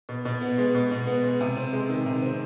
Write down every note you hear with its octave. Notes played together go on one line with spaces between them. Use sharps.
B2
B2
B3
G#3
B2
B2
B3
G#3
C3
C4
G#3
D#3
C3
C4